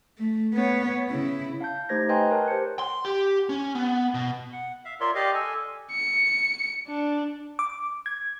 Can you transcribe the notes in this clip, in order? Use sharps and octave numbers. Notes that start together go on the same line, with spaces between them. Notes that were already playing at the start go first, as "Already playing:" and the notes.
A3
B3 C#5
C#3 E4
F5 A5 G6
A3 D#4 G4 C5 G#6 A#6
B4 D#5 G5 G#5 A#5 C6
A#4 C#5 A5 F#6
G4 C5 A5 C#7
C6
G4
C#4
B3
B2
F#5
E5 F5
F4 A#4 C#5 D5 E5 C6
G4 D5 D#5 F5
A4 G#5
C#7
D4
D6
G#6